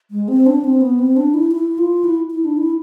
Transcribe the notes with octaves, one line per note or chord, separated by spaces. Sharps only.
G#3
C4
D4
C4
B3
C4
D4
E4
E4
F4
E4
E4
D4
E4